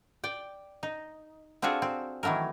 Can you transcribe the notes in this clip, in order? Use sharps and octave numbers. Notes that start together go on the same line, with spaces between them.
D5 G5
D#4
C4 D4 F4 F#4 G#4 A4
C4
D#3 E3 F#3 A3 A#4